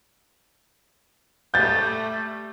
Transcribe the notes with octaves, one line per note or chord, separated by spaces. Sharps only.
G3 A3 G6 A6